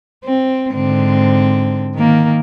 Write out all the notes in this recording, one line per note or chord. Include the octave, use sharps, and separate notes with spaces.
C4
G#2 D3 C4
D#3 A#3